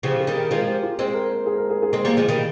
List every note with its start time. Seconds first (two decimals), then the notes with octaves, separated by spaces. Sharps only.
0.03 C#3 F3 G4
0.20 G#4
0.27 D#3 G3
0.36 A#4
0.51 F3 G#3 G#4
0.67 G4
0.83 F4
0.99 G#3 C4 C5
1.14 A#4
1.30 C5
1.46 G#4
1.58 A#4
1.70 G#4
1.82 G#4
1.93 G#3 C4 G#4
2.05 G3 A#3
2.17 F3 G#3
2.28 D#3 G3